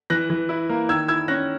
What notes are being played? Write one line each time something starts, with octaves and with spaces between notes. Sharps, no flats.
E3 F#6 A#6
E3
E4
A#3
D#3 E6 G#6
E4 E6 G#6
C#4 F#6 A#6